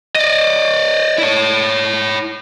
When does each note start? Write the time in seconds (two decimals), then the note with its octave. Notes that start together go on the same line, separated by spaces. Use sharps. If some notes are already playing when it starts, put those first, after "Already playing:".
0.16 D5 D#5
1.18 E4 C#5